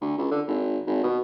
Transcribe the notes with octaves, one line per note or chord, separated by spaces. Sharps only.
D2
C#2
D3
G#1
G#1
B2